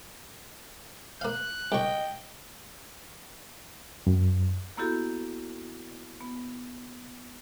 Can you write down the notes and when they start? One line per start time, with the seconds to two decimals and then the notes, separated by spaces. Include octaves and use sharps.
1.21 A#3 F5 F#6
1.72 C2 D#5 G5 C#6
4.07 F#2
4.77 A#3 B3 E4 F#4 G4 A4
6.20 B3